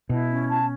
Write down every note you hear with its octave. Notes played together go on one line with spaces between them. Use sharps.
B2 E4
C#4
A5